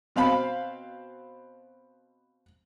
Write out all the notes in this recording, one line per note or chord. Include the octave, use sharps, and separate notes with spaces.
B2 C4 F5 B5